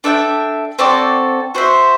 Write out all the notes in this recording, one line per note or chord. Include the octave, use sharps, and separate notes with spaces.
D4 A4 E5 G5
C4 F#4 A4 D5
F#4 C5 E5